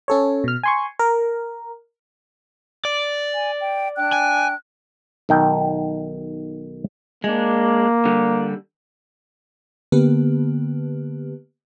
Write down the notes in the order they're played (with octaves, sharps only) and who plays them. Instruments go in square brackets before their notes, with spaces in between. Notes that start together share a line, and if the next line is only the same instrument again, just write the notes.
[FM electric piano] C#4 A4 C#5
B2 F6
G#5 C6 C#6
A#4
[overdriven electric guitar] D5
[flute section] G#5
G5
D4 G5 F#6
[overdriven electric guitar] G#5
[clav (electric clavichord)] B1 D#3 G5
[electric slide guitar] G#3 D4 [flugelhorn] A#3
[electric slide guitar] D3 G3
[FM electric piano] D3 A#3 B3 G4 B4